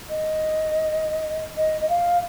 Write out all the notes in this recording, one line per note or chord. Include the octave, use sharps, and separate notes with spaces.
D#5
D#5
D#5
F5